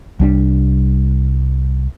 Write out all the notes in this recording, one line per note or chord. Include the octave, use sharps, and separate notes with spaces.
C2 G3 C#4 D4